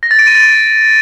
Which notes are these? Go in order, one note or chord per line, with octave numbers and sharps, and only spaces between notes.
A#6
A6
D7
D#7
A6